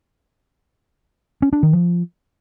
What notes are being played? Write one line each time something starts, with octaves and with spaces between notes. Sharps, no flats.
C#4
D4
D#3
F3